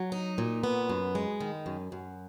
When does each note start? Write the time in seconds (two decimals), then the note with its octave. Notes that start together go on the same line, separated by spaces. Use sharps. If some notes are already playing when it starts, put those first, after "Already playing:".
Already playing: F#3
0.12 D#4
0.38 A#2
0.63 B3
0.89 F#2
1.15 G#3
1.40 D#3
1.66 F#2
1.92 F#2